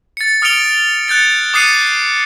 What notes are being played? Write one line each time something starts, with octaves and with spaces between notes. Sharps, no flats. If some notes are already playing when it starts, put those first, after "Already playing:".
A6 C#7
D#6 F6 C#7 D7 F7 G7
F#6 G6 A6 C#7
D6 D#6 F#6 C7 C#7 D#7